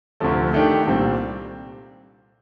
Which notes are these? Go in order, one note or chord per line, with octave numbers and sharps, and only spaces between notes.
D2 C3 F3 A3
D#3 A3 D4 G4
C2 A#2 G3 C4